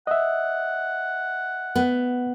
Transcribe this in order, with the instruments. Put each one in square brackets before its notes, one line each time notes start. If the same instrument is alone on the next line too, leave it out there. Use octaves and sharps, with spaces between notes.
[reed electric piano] D#5 E5 [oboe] F#5
[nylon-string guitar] B3